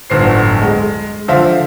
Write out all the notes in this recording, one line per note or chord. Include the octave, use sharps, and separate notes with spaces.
D1 G1 C5 C7
G#3
D3 F3 C5 E5 F5